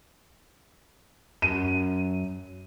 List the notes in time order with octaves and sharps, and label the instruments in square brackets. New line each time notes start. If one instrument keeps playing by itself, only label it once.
[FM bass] F#2 [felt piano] D#7